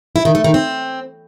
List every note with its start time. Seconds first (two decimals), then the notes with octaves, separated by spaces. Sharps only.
0.16 E4
0.25 D#3
0.35 A3
0.44 D#3
0.54 C4